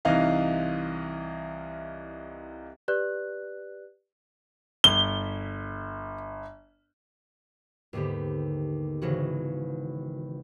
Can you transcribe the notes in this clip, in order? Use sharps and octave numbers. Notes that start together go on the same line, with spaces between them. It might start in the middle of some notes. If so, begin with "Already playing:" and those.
C2 E3 D#4 D#5 F5
G4 B4 D5 F#6
G1 G7
D#2 G#2 D3 B3 G4
G#1 C#3 E3 F#4